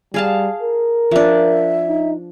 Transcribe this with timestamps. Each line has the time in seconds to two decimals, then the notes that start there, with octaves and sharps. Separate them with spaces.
0.14 G3 G#4 F5 A5
0.62 A#4
1.11 F3 D4 E5
1.88 D#4